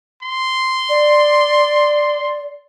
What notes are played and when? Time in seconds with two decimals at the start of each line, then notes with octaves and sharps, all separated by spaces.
0.23 C6
0.89 D5